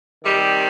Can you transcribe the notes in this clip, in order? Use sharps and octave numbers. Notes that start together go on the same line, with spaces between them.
C3 D#3 G3